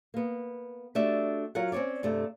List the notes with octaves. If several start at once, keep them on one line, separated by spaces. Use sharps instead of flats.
A#3 B3
A3 D4 F#4 G4 E5
F#3 F4 A#4 C#5 F#5
C4 C#4 D#4 C#5 D5
G2 C3 G3 A3